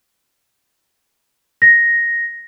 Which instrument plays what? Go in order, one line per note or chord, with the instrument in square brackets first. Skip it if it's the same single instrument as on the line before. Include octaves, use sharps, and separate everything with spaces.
[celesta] A#6